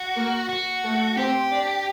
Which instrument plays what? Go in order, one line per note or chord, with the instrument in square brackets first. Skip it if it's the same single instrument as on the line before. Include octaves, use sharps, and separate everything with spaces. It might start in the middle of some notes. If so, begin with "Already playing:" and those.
Already playing: [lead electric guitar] F#4
[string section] A#3 A#4
[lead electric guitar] F#4
[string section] A3 A4
[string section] C4 C5 [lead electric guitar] G4
[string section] D4 D5